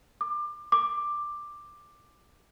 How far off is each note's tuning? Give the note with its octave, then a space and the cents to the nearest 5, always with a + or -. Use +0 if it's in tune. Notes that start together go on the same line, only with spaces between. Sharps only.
D6 +25
D6 +10